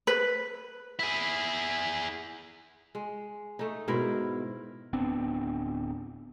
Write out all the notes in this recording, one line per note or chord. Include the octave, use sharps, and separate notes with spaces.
B4
E4 G#4
G#3
A3 D#4
G#2 B2 E4 A#4
D1 B3 C4 D4